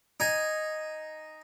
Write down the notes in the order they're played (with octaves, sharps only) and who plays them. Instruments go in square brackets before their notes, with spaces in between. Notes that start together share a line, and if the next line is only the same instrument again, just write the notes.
[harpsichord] D#4 G#5